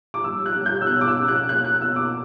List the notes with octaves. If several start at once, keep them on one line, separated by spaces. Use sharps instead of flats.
D6
G3 E6
F#6
G3
G6
E6
B2 F#6
D6
E6
C#4
F#6
A#3 F#6
F#6
B2 E6
D6